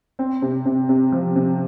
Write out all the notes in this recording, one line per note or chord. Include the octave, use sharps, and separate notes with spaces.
C4
C3
C3
C3
F3
C3